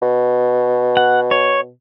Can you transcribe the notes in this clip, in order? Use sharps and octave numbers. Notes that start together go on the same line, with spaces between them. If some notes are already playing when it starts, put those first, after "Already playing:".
B2
F#5
C#5